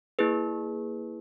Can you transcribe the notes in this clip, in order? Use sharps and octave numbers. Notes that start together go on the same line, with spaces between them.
A#3 E4 G#4 B4